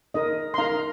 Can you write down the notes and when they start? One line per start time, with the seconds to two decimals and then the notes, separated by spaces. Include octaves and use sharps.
0.14 D#4 A#4 D#5
0.54 C6
0.58 D#4 A#4 F5 A#5